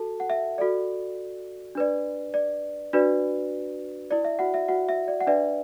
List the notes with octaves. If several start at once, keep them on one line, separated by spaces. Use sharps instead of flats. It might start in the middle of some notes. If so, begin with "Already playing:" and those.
Already playing: F#4 A4 A5
F#5
E5
F#4 A4 D5
D4 B4 D5
D5
D4 F#4 B4 D5
E4 D5
E5
F#4 F#5
E5
F#4 F#5
E5
D5
F#5
D4 B4 D5 E5